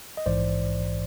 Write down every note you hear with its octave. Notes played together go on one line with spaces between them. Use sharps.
D#5
A#1 G#2 E3 C5 D5